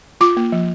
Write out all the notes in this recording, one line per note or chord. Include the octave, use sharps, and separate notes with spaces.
F4 D6
A#3
F3